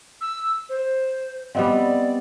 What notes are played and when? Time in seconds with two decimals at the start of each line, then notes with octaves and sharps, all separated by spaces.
0.21 E6
0.69 C5
1.55 G3 B3 C4 D5 D#5 F5